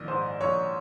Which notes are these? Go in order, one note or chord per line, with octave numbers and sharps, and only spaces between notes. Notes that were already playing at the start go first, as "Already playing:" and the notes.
Already playing: A#1 D#3 D#5
G#2 C5
A#1 C#5